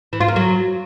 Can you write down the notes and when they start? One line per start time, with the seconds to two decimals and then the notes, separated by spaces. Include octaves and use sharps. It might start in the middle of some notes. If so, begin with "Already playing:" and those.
0.13 E3
0.21 F4
0.28 A#3
0.36 F#3